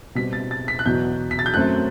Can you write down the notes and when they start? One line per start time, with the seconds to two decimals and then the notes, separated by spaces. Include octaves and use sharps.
0.15 B2 G3 C4 B6
0.33 A6
0.51 A6
0.68 B6
0.79 F#6
0.86 E2 B2 F#3 G6
1.31 B6
1.39 A6
1.46 G6
1.54 F#2 F#3 A3 C4 F#6